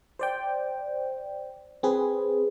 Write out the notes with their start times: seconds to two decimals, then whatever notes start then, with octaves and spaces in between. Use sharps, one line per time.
0.19 C5 D5 G5
1.83 C4 G#4 B4